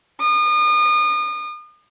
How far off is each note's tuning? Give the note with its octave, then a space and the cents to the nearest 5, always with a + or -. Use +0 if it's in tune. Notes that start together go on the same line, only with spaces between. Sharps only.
D#6 -40